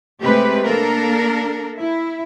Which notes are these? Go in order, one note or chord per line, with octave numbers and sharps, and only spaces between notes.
C3 G#3 A3 G4 B4
A#3 D4 A4 A#4
E4